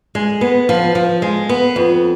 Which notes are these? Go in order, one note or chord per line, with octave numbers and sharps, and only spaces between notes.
G#3
B3
F3
F3
G#3
B3
F2